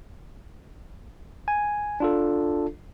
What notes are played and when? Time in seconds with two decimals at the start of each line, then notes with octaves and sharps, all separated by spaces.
1.48 G#5
2.00 D4 F4 A4